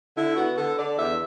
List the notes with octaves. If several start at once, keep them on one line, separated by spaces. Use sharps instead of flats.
D3 E4
B3 F#4
D3 A4
D3 D5
E2 E5